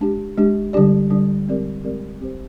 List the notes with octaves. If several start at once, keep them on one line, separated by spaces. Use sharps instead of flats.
G#3 D4 G4
G#3 D4 G4
D3 G3 D4 G4 D5
D3 G3 D4 G4 D5
G#3 C4 G4 A#4 D5
G#3 C4 G4 A#4 D5
C4 G4 C5